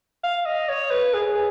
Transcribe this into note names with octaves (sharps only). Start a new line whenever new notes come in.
F5
D#5
C#5
B4
G#4